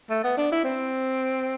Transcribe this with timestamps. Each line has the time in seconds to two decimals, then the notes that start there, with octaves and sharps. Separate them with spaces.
0.10 A3
0.24 B3
0.38 D4
0.52 E4
0.64 C4